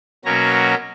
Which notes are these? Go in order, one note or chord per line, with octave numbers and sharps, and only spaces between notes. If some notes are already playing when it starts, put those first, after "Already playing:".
B2 F#3 A#3 C#4 A#5